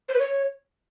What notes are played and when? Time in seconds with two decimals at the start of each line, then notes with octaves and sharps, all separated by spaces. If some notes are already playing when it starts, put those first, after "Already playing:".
0.09 C5
0.14 B4
0.19 C#5